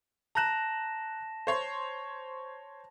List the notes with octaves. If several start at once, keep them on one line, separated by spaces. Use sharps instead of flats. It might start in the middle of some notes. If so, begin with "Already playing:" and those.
A5 A#5 F#6 A#6 E7
C5 C#5 C6